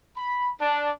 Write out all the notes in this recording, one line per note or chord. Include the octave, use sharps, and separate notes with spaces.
B5
D4